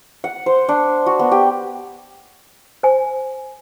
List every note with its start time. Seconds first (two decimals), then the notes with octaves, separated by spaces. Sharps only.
0.24 F#5
0.46 C5
0.69 D4
1.06 F#4
1.19 B3
1.31 G4
2.83 C5 G#5